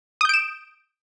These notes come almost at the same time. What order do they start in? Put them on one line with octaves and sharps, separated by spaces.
D#6 G6 D7 E7